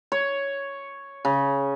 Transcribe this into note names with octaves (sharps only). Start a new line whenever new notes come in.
C#5
C#3